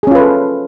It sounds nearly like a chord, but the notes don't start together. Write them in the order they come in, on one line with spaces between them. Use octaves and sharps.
G#4 C#4 F4 B4 A4